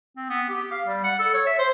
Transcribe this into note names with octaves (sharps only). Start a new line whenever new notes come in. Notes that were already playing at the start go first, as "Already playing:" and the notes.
C4
B3
G4
F5
G3
F#5
A4
C#5
E5
C5